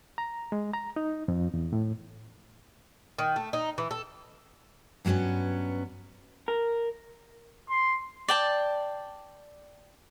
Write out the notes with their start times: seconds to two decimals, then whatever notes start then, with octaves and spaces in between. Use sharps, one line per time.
0.18 A#5
0.52 G#3
0.73 A#5
0.96 D#4
1.28 F2
1.54 E2
1.73 A2
3.19 D#3
3.36 A3
3.53 D#4
3.78 E3
3.91 A4
5.05 G2 F#3 A#3 B3 C#4
6.48 A#4
7.70 C6
8.28 D5 G5 A5